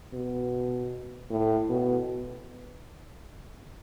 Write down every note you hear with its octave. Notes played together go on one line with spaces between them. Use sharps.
B2
A2
B2